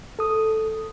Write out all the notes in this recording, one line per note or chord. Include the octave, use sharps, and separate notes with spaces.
A4 D#6